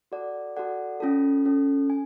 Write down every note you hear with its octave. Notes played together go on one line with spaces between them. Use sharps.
F#4 A4 D5 F#5
F#4 A4 D5 F#5
C#4 F4 A4
C#4 F4 A4
G#5